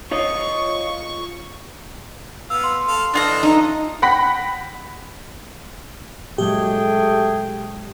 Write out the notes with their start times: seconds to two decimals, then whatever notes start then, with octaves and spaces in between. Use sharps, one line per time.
0.11 F4 C#5 D#5 C#6
2.50 B3 F5 E6
2.64 C6
2.88 A4 F5
3.14 E3 D4 F4 A4 D#5 A#5
3.43 D#4
4.02 F#5 G5 B5 A#6 B6
6.38 A#2 F#3 G#3 A3 G4 G#4 G5